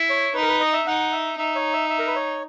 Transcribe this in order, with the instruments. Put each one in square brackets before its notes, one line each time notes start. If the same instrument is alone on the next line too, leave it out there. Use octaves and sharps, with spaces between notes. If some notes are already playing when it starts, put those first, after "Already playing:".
Already playing: [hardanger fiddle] E4
[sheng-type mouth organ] C#5
[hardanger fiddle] D#4 [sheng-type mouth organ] B4
[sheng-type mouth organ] A#4
B4
D#5
E5
[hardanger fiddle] D#4 [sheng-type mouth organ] F#5
[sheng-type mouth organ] E5
[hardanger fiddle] D#4 [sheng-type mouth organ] E5
[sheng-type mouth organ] C#5
E5
E5
A#4
B4
C#5